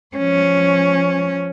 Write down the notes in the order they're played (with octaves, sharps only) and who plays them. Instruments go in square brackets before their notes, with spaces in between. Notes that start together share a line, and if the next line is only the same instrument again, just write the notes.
[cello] F3 C#4